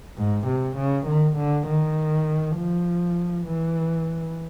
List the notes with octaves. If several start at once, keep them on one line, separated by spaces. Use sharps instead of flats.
G#2
C3
C#3
D#3
D3
D#3
F3
E3